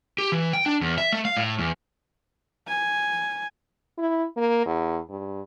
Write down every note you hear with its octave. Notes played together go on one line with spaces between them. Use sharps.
G4
E3
G5
D4
E2
E5
A3
F5
A2
E2
G#5
E4
A#3
E2
G2